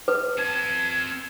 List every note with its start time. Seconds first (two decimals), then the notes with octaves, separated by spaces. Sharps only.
0.08 B4
0.38 C4 A5 G#6